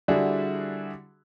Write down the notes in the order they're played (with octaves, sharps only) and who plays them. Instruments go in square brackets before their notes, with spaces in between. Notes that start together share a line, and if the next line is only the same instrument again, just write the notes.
[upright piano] D3 G3 D4 E4 F#4 G#4